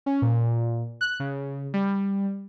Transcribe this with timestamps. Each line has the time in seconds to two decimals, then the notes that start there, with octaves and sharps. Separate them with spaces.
0.06 C#4
0.22 A#2
1.01 F#6
1.20 C#3
1.74 G3